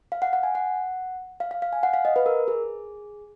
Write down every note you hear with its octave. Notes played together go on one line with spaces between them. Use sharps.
F5
F#5
F#5
G#5
F#5
F5
F5
F5
G#5
F#5
F5
D#5
B4
A#4
G#4